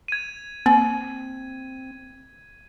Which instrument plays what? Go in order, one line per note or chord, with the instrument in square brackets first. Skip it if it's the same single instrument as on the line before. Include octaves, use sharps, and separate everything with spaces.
[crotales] G#6 D#7
[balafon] A#3 [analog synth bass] C4